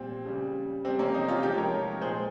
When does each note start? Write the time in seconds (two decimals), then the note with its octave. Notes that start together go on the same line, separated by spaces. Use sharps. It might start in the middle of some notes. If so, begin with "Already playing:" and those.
Already playing: A#2 G3 C4
0.25 C#3 G3
0.84 C3 C4
0.88 G3
0.99 A#3 C#4
1.14 C4 D#4
1.28 C#4 F4
1.43 C3 F3 G#3 D#4 G4
1.57 A#4 C#5
2.01 A#2 G#3 G#4 C5